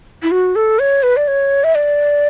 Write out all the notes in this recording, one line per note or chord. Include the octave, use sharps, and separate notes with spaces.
E4
F#4
A4
C#5
B4
D5
C#5
E5
D5